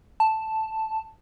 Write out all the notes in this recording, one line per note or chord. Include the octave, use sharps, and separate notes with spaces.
A5